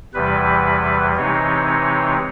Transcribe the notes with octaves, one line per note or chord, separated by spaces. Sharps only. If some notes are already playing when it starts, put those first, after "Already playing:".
E2 C3 E3 G3 B4
C3 E3 G#3 C4 D#4 C#5
C#5